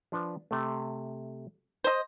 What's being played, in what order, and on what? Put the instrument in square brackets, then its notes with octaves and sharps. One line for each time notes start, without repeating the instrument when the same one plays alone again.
[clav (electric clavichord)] F3 D4 B4
C3 A3
[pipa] C5 D#5